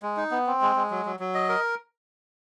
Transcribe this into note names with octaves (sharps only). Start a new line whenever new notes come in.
G#3
D#4
B3
C4
G#3
G#3
F#3
F#3
F#3
D#5
A#4